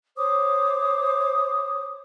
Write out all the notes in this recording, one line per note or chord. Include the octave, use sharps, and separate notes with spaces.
C5 C#5 D6 D#6